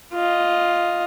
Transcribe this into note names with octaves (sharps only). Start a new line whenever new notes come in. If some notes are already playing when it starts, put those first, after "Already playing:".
F4 D#5